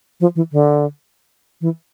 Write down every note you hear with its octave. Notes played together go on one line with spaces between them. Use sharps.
F3
E3
D3
E3